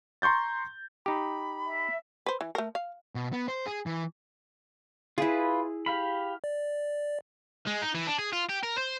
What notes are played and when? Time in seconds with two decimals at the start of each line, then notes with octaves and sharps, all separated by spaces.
0.22 A#5 C6 C#6 G6 A6
1.06 D#4 G4 B5
1.67 E5
2.26 B4 C5
2.41 E3
2.55 A3 A#4
2.75 F5
3.15 B2
3.33 B3
3.48 C5
3.66 G#4
3.86 E3
5.18 E4 F4 G#4 B4
5.86 G4 F5 B5
6.44 D5
7.67 G#3
7.82 D#4
7.95 E3
8.07 D4
8.19 G#4
8.33 F4
8.49 G4
8.63 A#4
8.78 C5